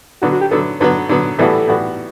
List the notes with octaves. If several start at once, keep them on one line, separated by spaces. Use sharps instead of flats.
D3 F#3 B3 F#4
F#4
G4
D3 F#3 B3 A4
D3 F#3 B3 B4
D3 F#3 B3
A2 E3 G3 B3 F#4 A4
A2 E3 G3 B3 F#4